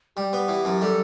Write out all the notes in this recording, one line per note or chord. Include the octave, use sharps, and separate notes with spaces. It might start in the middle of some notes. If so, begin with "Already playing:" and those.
G3 G4
B3
E3
F#2
G3 A4